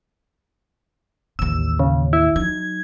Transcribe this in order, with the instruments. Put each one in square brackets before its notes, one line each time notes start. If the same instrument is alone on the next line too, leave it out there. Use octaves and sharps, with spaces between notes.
[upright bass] A1 D#2 [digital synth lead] E6
[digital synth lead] C#3
E4
[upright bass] F#3 D#4 [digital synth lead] G#6